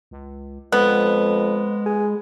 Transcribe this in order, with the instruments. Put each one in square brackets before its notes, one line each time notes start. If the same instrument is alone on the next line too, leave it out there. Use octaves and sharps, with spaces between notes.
[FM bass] C#2
[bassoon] F2 [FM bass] G#3 [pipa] B3
[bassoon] G#4